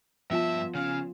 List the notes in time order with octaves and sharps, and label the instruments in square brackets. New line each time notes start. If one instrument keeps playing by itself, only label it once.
[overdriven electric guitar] G2 A5 [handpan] F3 B3 F4 [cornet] E5
[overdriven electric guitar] C#3 C#4 [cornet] F5